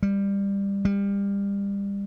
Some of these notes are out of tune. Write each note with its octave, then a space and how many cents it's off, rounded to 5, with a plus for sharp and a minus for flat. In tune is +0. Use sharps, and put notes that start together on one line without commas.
G3 +20
G3 +30